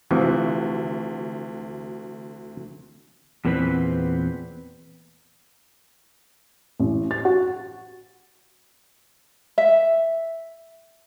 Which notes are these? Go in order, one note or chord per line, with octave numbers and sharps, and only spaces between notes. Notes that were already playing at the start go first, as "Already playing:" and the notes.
D2 C3 E3 F3 F#4 C#6
E2 A#2 B3 C4 B4
A1
A6
F#4
E5